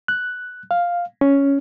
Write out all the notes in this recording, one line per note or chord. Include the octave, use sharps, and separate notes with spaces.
F#6
F5
C#4